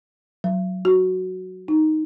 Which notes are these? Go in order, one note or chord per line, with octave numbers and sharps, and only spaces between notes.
F#3
F#4
D#4